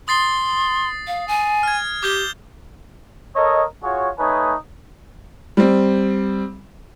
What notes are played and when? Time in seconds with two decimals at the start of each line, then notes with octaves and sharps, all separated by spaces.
0.08 C6 D#6 A6 C7
1.07 F5
1.28 G#5
1.63 F6 G#6
2.03 G4 D6 G6 G7
3.36 A4 A#4 C#5 D#5
3.83 F4 F#4 G#4 C#5
4.19 A3 D#4 B4 C#5 G#5 D#6
5.57 G3 C4